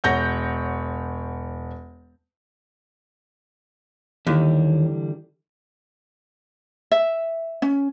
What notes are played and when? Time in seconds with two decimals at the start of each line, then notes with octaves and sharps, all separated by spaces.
0.04 E1 C#5 F#5 G6 A#6
4.27 D#2 D3 E3 G3
6.91 E5
7.62 C#4